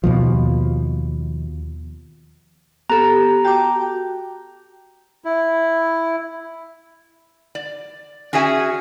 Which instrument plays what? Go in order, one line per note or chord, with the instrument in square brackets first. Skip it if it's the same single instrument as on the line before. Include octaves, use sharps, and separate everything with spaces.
[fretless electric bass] D#2 B2 F3
[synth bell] B3 A4 [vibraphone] G4 [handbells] A#5
[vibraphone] F#4 [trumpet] G5 [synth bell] A5 D6
[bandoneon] E4
[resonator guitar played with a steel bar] D5
C#4 F#4 G#4 E5 G#5